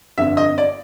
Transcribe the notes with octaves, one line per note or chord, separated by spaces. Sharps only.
G1 F2 D3 E5
D#5
D5